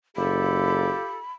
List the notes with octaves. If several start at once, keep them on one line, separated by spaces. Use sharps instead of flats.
F#1 F4 G4 A4 B5